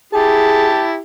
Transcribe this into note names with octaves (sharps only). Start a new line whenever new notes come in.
E4 G4 G#4 A5